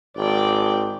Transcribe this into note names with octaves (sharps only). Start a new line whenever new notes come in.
G#1 D5 G5